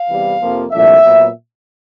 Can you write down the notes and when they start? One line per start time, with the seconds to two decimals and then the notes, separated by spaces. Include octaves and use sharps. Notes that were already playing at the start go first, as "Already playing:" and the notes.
Already playing: F5
0.09 E2 C3 E3 G3
0.40 F2 C3 F3 A#3
0.72 C2 A#2 F3 A3 D4 E5
1.03 A#2 F#3 B3